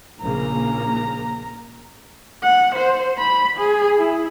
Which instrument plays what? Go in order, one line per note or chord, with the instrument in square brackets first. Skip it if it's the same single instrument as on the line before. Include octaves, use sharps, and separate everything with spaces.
[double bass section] A#1 C#3 A#3 [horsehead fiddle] A#5
[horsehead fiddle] F#5
C5
B5
G#4
E4